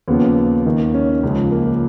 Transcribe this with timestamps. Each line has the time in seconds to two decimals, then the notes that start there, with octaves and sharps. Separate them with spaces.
0.08 D#2 C#3 F3 B3
0.65 D#2 D#3
0.94 C#4
1.23 C#2 C#3 F3
1.52 A#3